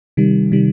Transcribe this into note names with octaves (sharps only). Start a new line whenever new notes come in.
C3 D#3 G3
C3 D#3 G3